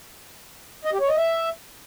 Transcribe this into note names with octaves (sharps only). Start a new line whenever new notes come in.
D#5
G4
C#5
D#5
E5